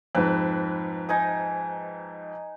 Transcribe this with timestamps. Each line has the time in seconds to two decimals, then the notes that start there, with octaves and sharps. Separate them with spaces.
0.15 F2 G#2 B4
1.09 D#4 G#5 D#6